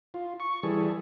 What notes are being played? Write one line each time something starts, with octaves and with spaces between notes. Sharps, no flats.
F4
C#6
E3 G3 G#4 A4